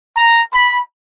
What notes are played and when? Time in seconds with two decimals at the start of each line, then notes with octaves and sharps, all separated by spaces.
0.17 A#5
0.53 B5